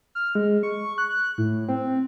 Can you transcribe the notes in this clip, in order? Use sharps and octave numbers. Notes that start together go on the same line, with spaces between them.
F6
G#3
C#6
F#6
A2
C4